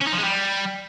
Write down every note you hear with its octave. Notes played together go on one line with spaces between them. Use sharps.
C#4
D#4
F3
G#3
G3